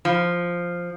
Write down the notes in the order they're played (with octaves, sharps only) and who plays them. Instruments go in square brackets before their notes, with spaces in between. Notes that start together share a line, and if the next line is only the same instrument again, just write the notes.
[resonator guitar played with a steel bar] F3